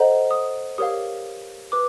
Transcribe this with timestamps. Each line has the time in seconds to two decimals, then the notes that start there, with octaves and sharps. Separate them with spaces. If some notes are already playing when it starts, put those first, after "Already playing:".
Already playing: A4 C5 D#5 F#5 A#5
0.31 D#6
0.78 G4 A#4 C#5 F5 D#6
1.72 B4 D6